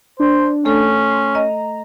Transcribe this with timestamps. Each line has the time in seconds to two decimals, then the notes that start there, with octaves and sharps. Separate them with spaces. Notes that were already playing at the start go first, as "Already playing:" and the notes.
0.20 D4 C5
0.65 A3 C#4 A4
1.00 C6
1.35 D#5 A#5